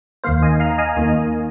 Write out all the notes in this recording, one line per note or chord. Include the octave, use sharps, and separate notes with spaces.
D#2 D#3 A#3 C5 F5
D#5 G#5
F5 A#5
D#5 G#5
D#2 D#3 A#3